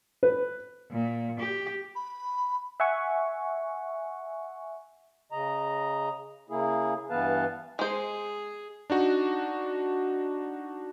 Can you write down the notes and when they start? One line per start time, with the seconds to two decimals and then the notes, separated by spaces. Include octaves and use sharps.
0.23 B4
0.91 A#2
1.40 G4
1.96 B5
2.80 E5 F#5 G#5 C#6
5.32 C#3 D#5 A#5
6.49 C#3 A#3 E4 G#4
7.10 G2 E3 B3 B4 F5 A5
7.79 G#3 G#4 C5
8.90 D4 D#4 F#4